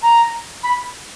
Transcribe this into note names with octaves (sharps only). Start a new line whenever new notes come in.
A#5
B5